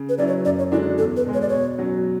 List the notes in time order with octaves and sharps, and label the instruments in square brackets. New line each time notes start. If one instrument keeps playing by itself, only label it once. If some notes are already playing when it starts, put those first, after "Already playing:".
Already playing: [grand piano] C#3
[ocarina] B4
[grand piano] F#3 C#4 E4 [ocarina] D5
[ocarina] C#5
[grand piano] F#2 [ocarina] D5
[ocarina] C#5
[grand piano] D3 G#3 D4 F#4 [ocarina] E4
[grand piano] E2 [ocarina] A4
[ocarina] B4
[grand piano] B2 G#3
[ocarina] C#5
D5
[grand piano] B2 [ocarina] C#5
[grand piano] F#3 C#4 F#4